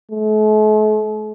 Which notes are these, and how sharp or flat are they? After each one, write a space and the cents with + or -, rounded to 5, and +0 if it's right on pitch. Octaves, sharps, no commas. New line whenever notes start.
A3 -45